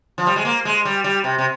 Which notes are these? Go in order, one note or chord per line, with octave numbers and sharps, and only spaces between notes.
F3
G3
G#3
A#3
G#3
G3
G3
C3
C3